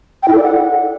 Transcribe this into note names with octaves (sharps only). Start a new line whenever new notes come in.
G5
E4
A4
D5
F#5